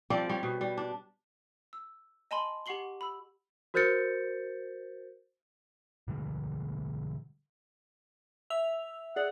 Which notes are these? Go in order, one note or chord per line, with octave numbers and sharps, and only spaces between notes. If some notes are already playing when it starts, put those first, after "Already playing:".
F3 G3 C4 D5
G3 C#5
B2
G3
D4
E6
D#5 G#5 A5 B5 C6 F#7
G4 F#5 C#6 C7 F#7 G7
B5 E6
F#4 A#4 C5 G6 A6 C#7
B2 D3 G3 G#3
E5 E6 F7
G#4 D5 F#5